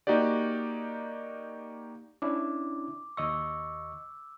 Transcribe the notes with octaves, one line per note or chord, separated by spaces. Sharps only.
A#3 D#4 F#4 G4 D5
C#4 D4 E4 D6
D#2 D#5 C#6 E6